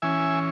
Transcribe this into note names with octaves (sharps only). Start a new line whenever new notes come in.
E3 C#4 E5 G#5